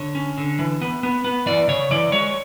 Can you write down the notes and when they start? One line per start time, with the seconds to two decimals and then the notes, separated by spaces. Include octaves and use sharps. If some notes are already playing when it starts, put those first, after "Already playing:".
Already playing: D3 C#5
0.15 C#4
0.38 D3
0.59 E3
0.82 B3
1.03 B3
1.24 B3
1.46 E3 D5
1.68 C#3 C#5
1.91 E3 D5
2.12 G#3 C#5